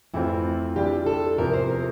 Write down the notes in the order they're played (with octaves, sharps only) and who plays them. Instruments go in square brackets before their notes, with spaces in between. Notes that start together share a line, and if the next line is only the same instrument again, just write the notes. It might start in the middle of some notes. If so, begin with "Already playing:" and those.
[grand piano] F2 E3 A3 C4 F4 [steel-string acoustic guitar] E4
[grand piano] E3 G3 D4 F4 [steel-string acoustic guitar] G4
[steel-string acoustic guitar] A4
[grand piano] E2 C3 F3 [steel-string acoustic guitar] A#4
[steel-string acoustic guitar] C5
A#4